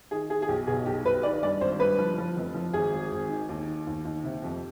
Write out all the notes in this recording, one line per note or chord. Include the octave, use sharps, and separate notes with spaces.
D#3 G#4
D#3 G#4
G#4
B1 G4
B2 G#4
B1 G4
B1 B4
D#3 D5
G2 D5
G#1 C5
G2 B4
F3
F3
F1
F3
G#1 G#4
G#1
G#1
D#3
D#2
D#3
D#2
D#2
C3
F2